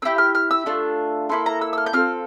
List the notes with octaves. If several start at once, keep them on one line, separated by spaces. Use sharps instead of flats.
C4 E4 G4 E6
F6
F6
E6
A3 D4 F4
A#3 E4 A4 C6
A#5
E6
E6
F6
G6
C4 F4 A4 F6